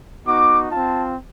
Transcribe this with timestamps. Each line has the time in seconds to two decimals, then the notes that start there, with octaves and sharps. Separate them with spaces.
0.27 B3 D#4 F#4 D6
0.70 C4 F4 A5